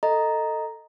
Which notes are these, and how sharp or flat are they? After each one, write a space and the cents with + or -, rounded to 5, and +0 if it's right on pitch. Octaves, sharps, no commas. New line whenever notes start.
A4 +15 D#5 +0 A#5 +0